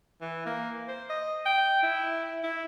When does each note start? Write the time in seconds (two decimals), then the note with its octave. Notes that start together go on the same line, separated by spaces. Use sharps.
0.21 E3
0.46 A#3
0.88 C5
1.09 D#5
1.46 G5
1.83 E4
2.43 E4